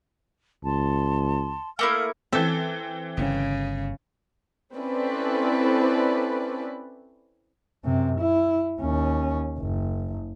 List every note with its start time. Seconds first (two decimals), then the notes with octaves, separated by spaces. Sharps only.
0.64 C#2 A5 C6
1.79 A3 A#3 E4 F5 D#6 F6
2.33 E3 C4 A4 E5
3.17 G1 C#3
4.75 C4 C#4 E4 A4 B4 D5
7.84 F#2 C3
8.20 E4
8.81 D#2 C#4
9.59 F#1